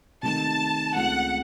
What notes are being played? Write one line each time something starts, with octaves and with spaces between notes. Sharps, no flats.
C3 D#3 A3 D#4 A5
C#2 C#3 A3 C4 F4 F#5